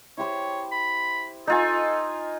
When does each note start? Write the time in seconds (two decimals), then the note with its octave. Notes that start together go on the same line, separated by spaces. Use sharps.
0.18 E4 G4 C5 C#5
0.72 B5
1.47 D#4 F4 A4 D#5 G#5